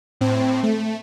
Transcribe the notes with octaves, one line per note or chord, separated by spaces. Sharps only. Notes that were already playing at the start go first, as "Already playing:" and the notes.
A2 C4
A3